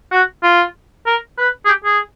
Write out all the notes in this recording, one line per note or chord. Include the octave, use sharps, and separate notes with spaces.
F#4
F4
A#4
B4
G#4
G4
G#4